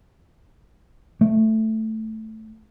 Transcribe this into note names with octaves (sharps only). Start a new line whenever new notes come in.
A3